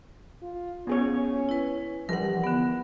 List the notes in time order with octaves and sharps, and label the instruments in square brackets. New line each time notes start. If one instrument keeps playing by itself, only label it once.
[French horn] F4
[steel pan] B3 G#4 C#5 [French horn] C#4
[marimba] E4 B4
[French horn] E3 [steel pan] F3 G3 [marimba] A#4 F#5
[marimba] D3 B3